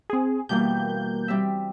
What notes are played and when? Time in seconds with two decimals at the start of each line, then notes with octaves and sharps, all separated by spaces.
0.10 C4 G#4
0.49 B2 E3 G3 A#3 G6
1.28 G3 C4 E5